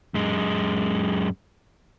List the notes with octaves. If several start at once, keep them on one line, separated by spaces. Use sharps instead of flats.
F#2 G#3